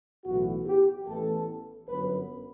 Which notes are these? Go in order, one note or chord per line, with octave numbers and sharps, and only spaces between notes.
B1 A2 E3 B3 F#4
G4
A1 A2 E3 B3 A4
G1 F#2 F#3 B3 B4